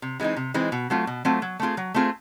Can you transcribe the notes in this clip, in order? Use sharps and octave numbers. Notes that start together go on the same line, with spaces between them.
C3
E3 G#3 C4 D#4
C3
E3 G#3 C4 D#4
B2
F#3 A3 C4 F4
B2
F#3 A3 C4 F4
F#3
A3 C4 F4 G#4
F#3
A3 C4 F4 G#4